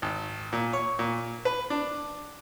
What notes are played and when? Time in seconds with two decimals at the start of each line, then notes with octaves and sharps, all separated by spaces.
0.02 G#1
0.53 A#2
0.73 C#5
0.99 A#2
1.45 B4
1.70 D4